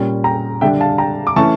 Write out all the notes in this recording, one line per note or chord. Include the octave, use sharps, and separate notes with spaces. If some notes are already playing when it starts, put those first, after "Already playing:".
Already playing: A#2 G3 C#4
G5 A#5
D3 G3 D4 E5 G5
F5 A5
G5 A#5
D6
E3 A3 C#4 A5 C#6